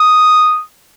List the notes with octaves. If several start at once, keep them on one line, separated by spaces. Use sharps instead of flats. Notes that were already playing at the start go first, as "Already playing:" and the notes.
Already playing: D#6